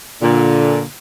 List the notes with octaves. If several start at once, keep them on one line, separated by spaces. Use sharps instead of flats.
A#2 D3